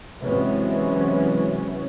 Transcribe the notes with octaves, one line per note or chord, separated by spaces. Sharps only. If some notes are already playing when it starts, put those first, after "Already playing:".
C3 E3 F#3 G#3 B3 C#4